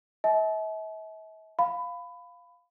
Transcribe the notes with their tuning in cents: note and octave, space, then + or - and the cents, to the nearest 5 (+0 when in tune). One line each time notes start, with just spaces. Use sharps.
E5 -45 A5 -45
F5 +5 B5 +20